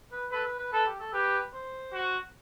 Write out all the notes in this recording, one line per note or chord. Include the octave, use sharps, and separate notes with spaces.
B4
A4 B4
B4
B4
A4 B4
G4
A4
G4 B4
C5
F#4